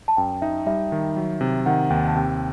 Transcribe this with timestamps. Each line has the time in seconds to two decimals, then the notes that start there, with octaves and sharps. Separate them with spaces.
0.08 A5
0.17 F#2 G5
0.42 D#4 E5
0.66 G3 E5
0.92 D#3
1.17 F#3
1.41 C3
1.66 D#3 F#5
1.90 D#2 G5
2.08 A5
2.16 C3 G5